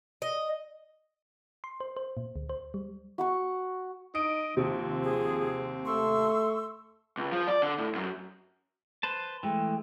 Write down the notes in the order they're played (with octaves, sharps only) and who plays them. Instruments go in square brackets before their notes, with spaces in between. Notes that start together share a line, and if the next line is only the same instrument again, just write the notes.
[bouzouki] D#5
[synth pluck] C6
C5
C5
A#2
D2
C5
G3
[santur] F#4 F#5 C#6
[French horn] D#4 [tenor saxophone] D#5 [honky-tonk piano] D7
[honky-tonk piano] D#2 C3 [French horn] F3 [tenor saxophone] C4
[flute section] G#4
[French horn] A3 [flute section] C6 C#6 E6
[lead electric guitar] C#2
F3
D5
D3
A2
F#2
[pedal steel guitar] B4 C5 A5
[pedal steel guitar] E3 G#3 A3 [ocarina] G5